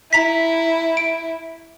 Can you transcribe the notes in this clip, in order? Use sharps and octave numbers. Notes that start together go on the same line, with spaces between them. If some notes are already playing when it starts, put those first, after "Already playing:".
E4 A#5 B6
D7